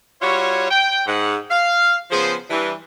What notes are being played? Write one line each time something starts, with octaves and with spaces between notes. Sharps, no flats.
G3 F4 F#4 C#5
G5
G#2 F#5
F5
C#3 F3 B3 G#4 C5
E3 G3 D4